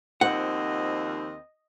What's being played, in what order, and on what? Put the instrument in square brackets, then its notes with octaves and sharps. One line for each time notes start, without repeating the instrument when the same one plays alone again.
[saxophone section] D#2 F3 C4 [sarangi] D#5 [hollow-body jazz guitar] F#5